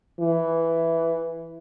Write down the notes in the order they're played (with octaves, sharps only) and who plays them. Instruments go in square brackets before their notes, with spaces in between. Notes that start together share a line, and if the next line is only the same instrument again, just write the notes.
[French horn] E3